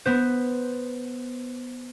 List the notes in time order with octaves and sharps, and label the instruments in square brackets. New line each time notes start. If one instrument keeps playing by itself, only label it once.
[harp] B3 C5